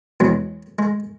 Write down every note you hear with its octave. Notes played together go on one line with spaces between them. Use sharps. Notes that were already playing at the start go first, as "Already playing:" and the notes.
E2 B2 F#3 G#3
G#3